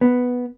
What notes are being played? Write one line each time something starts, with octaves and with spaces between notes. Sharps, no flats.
B3